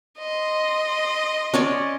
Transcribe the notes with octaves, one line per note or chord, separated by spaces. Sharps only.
D#5 C6
C#4 C#5 D5